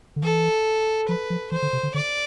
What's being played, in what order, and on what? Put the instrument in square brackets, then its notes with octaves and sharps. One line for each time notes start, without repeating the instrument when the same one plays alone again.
[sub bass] D3
[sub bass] E3 [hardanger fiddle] A4
[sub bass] F3 [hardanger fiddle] B4
[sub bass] F3
[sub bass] E3 [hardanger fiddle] C5
[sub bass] D3
C3
D3
[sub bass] D3 [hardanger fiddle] D5